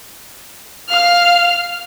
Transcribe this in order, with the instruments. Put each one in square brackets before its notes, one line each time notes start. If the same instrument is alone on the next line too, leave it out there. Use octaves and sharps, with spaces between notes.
[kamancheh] F5 F6